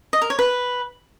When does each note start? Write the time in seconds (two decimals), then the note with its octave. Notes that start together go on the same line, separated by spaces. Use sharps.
0.13 D#5
0.22 A#4
0.30 C#5
0.39 B4